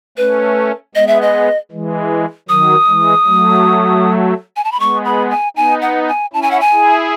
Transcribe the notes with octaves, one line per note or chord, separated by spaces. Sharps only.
A3 C#4 B4
G#3 B3 D#5
E5
D#5
E3 G#3
D#3 F#3 D#6
E3 G#3
F#3 A3
G#5
A5
B5
G#3 B3 C#6
B5
G#5
B3 D#4 G#5
F#5
G#5
C#4 E4 A5
G#5
F#5
G#5
E4 G#4